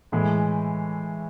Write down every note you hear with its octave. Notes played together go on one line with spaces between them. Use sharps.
A2 E3 G#3